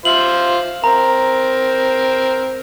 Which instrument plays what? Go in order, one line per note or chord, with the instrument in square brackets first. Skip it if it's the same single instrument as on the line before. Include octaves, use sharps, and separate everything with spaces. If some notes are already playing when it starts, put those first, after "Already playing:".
[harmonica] F4 C5 E5 [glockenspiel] F#7
[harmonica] C4 A#4 [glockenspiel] A#5